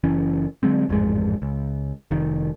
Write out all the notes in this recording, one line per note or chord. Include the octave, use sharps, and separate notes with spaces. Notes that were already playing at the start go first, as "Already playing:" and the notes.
F#1 E3 C#4
D3 F#3 G#3 C4
A1 F2 G#2 G#3
C#2
F1 D#3